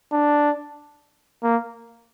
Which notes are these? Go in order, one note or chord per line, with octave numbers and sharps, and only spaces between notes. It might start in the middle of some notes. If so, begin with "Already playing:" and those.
D4
A#3